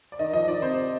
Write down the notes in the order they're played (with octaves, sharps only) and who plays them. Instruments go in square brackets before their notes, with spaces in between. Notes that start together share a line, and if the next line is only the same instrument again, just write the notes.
[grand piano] D5
[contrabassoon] D#3 [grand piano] D#5
[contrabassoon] F3 [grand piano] D#5
[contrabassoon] D#3 [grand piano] D5
[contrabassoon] C3 [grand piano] C5